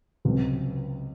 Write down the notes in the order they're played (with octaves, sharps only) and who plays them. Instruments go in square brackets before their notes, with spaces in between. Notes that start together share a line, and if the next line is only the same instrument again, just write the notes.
[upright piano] C#2 C3 F#3 C4